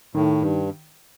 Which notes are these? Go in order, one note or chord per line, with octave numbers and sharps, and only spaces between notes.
A2 D#3
G2